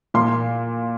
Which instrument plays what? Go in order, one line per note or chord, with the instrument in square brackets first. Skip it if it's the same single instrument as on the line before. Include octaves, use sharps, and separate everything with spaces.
[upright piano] A#2 C6